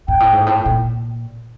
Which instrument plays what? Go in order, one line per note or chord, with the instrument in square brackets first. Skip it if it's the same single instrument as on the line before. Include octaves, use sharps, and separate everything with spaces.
[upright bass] G#2 [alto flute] G5
[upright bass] A2
G#2
[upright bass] A2 [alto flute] G5
[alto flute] G5
[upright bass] A#2